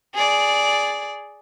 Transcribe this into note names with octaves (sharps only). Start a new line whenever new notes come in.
G#4 D5